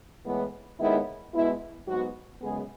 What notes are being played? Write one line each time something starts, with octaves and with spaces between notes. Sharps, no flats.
A2 E3 G#3 B3
D#2 D#3 G#3 B3 E4
B2 G#3 B3 E4
G#2 F#3 B3 F#4
F#2 C#3 G#3 B3 G#4